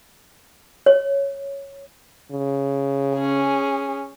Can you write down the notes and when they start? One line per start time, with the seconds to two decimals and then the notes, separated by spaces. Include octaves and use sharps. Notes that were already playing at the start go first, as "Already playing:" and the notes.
0.86 C#5
2.31 C#3
3.15 C#4 G#4